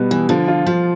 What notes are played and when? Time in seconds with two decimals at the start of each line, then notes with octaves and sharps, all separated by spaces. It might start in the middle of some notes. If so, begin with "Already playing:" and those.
Already playing: B2 G3 B3
0.10 E3 B3
0.29 D3 F3
0.48 F4
0.66 F3 F4